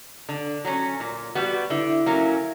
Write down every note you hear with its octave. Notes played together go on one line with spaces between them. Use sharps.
D3
F#3 C#4
A#2
G3 B3 F#4
D3 E4 E5
F#3 A#3 C#4